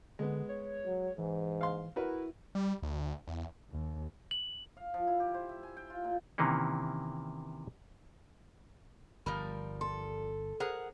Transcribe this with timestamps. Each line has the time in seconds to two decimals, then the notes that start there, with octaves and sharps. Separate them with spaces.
0.19 D3 G#3 B3
0.49 C#5
0.86 F#3
1.18 G#2 E3
1.61 F5 C6
1.96 E4 F#4 A#4 B4
2.55 G3
2.82 D2
3.28 E2
3.71 D#2
4.31 F#7
4.77 F5
4.94 F3
5.07 E4
5.20 G4
5.34 C5
5.49 E5
5.63 G#5
5.77 G5
5.90 F4
6.04 A#2
6.38 C3 D#3 E3 A#3 C#4
9.26 G1 F3 G3 A#4 B5
9.81 A4 C6
10.60 G#4 A#4 C5 F#5